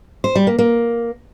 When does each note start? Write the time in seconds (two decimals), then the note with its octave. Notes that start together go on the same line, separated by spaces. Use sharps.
0.24 C5
0.35 G3
0.47 A#3
0.59 A#3